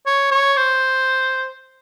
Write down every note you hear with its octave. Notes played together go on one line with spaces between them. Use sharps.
C#5
C#5
C5